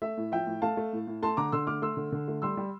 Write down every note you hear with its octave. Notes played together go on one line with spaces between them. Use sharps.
A3 E5
A2
F3 E5 G5
A2
A3 F5 A5
A3
A2
A2
A3 A5 C6
D3 A#5 D6
D3 C6 E6
A3 D6 F6
A3 C6 E6
D3
D3
A3
G3 C6 E6
G3